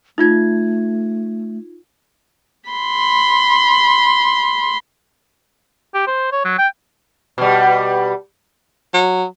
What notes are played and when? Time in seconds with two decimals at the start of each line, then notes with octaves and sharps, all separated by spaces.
0.18 A3 D#4 F4 G#6
2.70 B5 C6
5.94 G4
6.07 C5
6.32 C#5
6.45 F#3
6.59 G5
7.38 B2 G3
8.94 F#3